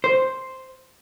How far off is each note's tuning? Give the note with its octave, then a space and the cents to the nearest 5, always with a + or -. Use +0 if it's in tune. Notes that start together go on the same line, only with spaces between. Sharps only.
C5 +0